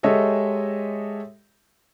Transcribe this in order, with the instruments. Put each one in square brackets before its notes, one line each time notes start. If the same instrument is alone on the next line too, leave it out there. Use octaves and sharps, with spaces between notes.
[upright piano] G#3 G4 A4 C#5 D#5 E5